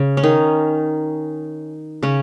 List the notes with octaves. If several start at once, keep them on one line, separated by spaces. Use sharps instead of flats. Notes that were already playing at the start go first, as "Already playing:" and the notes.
Already playing: C#3
C#4
D#3 D#4
C#3 C#4